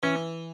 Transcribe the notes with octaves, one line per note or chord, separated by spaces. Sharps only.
E3 C#4